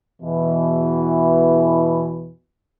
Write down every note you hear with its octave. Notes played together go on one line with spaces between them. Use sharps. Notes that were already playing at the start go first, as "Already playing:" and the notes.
E2 B2 E3